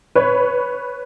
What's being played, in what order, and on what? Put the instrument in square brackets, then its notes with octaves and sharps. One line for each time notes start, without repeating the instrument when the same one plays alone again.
[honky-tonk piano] B4 C#5